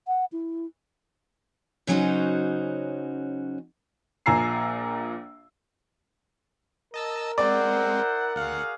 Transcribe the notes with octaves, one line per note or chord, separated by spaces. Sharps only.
F#5
E4
C#3 F#3 C#4 D#4 F#4 C5
A#1 A#2 G#5 A#5 E6 C7
A#4 D#5 A5 E6
G#3 C4 E4 C5 D5 F#5
D2 F#4 G#4 F5 F#5